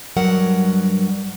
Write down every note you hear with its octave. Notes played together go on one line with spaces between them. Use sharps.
G2 F#3 A#4 F#5